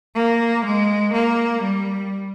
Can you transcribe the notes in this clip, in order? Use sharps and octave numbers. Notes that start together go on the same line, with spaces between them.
A#3
G#3
A#3
G3